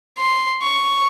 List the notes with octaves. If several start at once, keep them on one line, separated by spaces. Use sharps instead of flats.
C6
C#6